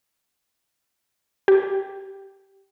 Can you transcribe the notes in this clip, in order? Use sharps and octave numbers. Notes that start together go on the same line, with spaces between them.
G4